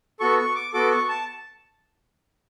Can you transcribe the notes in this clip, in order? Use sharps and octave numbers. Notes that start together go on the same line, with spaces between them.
B3 F#4 A4 C#6
C#6
D6
B3 F#4 A4 D6
C#6
A5